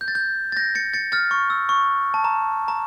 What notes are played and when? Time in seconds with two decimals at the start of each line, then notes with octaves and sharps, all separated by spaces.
0.01 G6
0.08 A6
0.15 G6
0.52 A6
0.56 G6 A#6
0.75 A6 C#7
0.94 A6 C#7
1.12 F6 A6
1.31 C#6
1.50 E6
1.69 C#6
2.14 A5
2.24 A#5
2.68 A#5